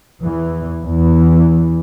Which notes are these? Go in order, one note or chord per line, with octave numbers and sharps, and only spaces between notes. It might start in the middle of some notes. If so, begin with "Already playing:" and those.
E2 E3
E2 E3